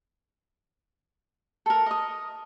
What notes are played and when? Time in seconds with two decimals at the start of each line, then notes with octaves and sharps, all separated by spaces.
1.66 A4 A#4
1.86 D#5 D#6